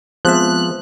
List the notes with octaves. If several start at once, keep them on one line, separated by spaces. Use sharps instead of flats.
F3 G#3 B3 C4 E5 F#6